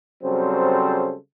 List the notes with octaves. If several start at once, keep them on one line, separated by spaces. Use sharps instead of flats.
C#3 F#3 G3 C4 A4 C5